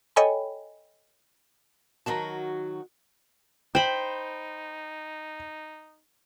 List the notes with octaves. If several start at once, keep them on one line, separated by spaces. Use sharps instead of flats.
A4 C#5 D#5 G5 G#5 B5
D#3 F#3 F#4 A5 A#5
D#4 C5 G5 B5